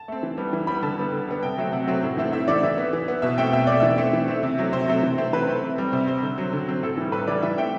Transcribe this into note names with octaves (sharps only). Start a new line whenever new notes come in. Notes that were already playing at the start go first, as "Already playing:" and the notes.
Already playing: A5
A3 C4
E3
G3 B3
E3
G3 B3 B5
D3 A5
G3 B3
D3
G3 B3
C3 G5
F#3 A3 C4
C3 F#5
F#3 A3 C4
A2
E3 A3 C4
A2 E5
E3 A3 C4 D5
E3 E5
B3
E3
B3
B2 E5
A3 C4 G5
B2 E5
A3 C4 D5
E3 E5
A3 C4
E3
A3 C4
C3
F#3 A3 C4
C3 C5
F#3 A3 C4
E3
A3 C4
E3 B4
A3 C4
C3
G3 C4
C3 C5
G3 C4 C5
D3
F#3 C4
D3
F#3 C4
A2 A4
E3 G3
A2 B4
E3 G3 D5
E3 E5
A3 C4 G5